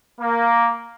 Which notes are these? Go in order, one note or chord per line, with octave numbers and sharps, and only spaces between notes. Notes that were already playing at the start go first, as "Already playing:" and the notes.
A#3